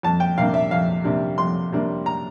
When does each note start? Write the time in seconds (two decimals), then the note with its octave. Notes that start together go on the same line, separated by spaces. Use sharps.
0.03 F2 A5
0.20 G5
0.37 C3 G3 A#3 D4 F5
0.54 E5
0.71 F2 F5
1.04 C3 G3 A#3 D4
1.38 F2 C6
1.72 C3 G3 A#3 D4
2.06 A#5